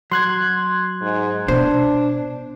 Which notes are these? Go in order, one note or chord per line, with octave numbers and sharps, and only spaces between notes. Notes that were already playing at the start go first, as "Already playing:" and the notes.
F#3 C6 F#6 G#6
G#2
B2 D4 C5